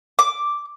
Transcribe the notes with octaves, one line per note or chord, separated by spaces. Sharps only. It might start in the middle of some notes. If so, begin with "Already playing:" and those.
D6